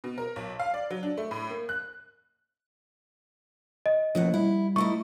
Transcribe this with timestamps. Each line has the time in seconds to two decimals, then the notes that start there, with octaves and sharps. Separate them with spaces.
0.04 B2
0.18 A#4
0.36 B1
0.60 F5
0.74 D5
0.90 F#3
1.03 D4
1.17 A3
1.31 A2
1.50 A#3
1.69 F#6
3.86 D#5
4.15 D#2 A2 F3 C#4 F#5
4.34 G3 E4
4.76 A3 D#4 E4 C#6